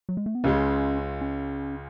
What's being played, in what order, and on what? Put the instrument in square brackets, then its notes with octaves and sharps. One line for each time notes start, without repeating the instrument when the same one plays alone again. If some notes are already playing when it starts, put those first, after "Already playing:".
[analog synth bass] F#3
G#3
A3
B3
[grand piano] C#2 C#3 G#3 [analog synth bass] C#4
[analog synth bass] C#4